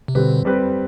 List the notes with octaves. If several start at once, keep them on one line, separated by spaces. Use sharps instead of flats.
C3
B2 D3 G3 C4 G4 B4
G3 C4 G4 B4